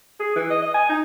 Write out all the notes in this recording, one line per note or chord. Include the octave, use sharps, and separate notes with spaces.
G#4
E3
D#5
D#5
G#5
D#4